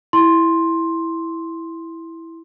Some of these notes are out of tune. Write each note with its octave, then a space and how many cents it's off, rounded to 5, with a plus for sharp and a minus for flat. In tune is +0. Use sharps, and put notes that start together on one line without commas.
E4 +0 C6 +5